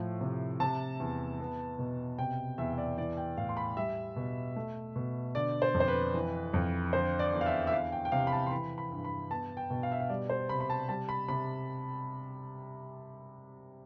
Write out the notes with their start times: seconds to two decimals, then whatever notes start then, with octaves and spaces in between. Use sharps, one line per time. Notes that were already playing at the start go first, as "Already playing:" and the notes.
Already playing: A2 F3
0.21 C3
0.60 C3 A5
1.00 E2
1.40 B3
1.79 B2
2.19 C3 G5
2.58 E2 E5
2.73 E5
2.78 D5
2.98 E3 D5
3.17 G5
3.37 A2 F5
3.49 C6
3.57 B5
3.77 G3 E5
4.16 B2
4.56 A3
4.96 B2
5.35 D3 D5
5.62 C5
5.74 F2
5.80 C5
5.88 B4
6.14 E3
6.54 F2
6.93 D3 C5
7.19 D5
7.33 E2
7.41 F5
7.46 E5
7.67 E5
7.72 E3 F5
7.92 G5
8.05 G5
8.12 C3 F5
8.27 B5
8.32 A5
8.46 C6
8.51 E3 B5
8.78 B5
8.91 G2
9.05 B5
9.30 B3 A5
9.57 G5
9.70 B2
9.83 F5
9.92 E5
10.00 F5
10.10 G3 D5
10.30 C5
10.49 C3 B5
10.60 B5
10.70 A5
10.89 G3 A5
11.09 B5
11.28 C3 B5